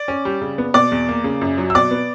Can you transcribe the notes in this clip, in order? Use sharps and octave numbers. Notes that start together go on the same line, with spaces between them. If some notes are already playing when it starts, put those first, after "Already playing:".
Already playing: D5
C#4
G3
C#3
B3
B2 D5 D6
E2
A#3
C#3
F#2
F#3
E6
B2 D5 D6
B3